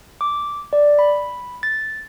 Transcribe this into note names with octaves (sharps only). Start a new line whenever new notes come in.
D6
D5
B5
A6